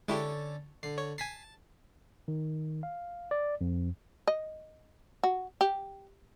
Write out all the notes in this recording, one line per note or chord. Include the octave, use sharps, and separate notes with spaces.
D3 G#3 C#4 E4 G4 A4
D3 C7
C#5
G#5 A5 B6 C7
D#3
F5
D5
F2
D#5
F#4
G4